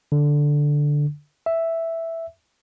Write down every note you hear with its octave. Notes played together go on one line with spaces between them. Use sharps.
D3
E5